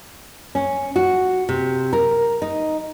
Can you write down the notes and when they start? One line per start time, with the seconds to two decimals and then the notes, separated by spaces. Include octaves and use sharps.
0.55 C#4
0.96 F#4
1.49 C3
1.93 A#4
2.42 D#4